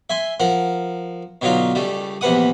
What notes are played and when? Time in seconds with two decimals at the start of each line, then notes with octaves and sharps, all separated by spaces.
0.10 E5 G#5 C6
0.40 F3 A#4 F#5
1.41 B2 D3 F#3 D#4 F4
1.75 C#2 G3 A3
2.21 A#1 E2 C3 B4 F#5 D#6